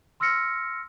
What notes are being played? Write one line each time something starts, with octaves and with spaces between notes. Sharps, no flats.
C6 E6 F6 A#6 C#7